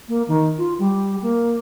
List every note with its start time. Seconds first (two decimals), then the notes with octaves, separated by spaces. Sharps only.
0.08 A#3
0.28 D#3
0.58 F4
0.79 G3
1.22 A#3